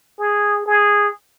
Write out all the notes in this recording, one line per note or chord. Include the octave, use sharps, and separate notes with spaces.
G#4
G#4